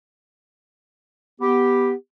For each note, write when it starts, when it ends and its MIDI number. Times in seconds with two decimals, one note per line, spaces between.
1.41 1.93 59
1.41 1.93 67